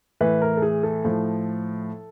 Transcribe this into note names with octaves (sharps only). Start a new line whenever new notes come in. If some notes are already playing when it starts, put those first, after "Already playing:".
A2 E3 B4
A#4
A4
G#4
A4
A2 F3